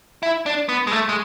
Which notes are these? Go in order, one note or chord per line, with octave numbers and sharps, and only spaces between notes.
E4
D4
B3
G#3
A3
G#3